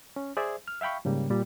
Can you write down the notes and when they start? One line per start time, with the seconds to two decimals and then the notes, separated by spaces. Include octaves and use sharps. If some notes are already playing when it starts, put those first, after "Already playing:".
0.16 C#4
0.37 G#4 C5 D5 E5
0.68 F6
0.81 E5 F5 G5 B5 C#6
1.05 G#2 C#3 G3 A#3
1.30 A#2 G3